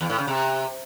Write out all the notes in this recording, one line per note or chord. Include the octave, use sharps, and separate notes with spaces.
E2
A2
C#3
C3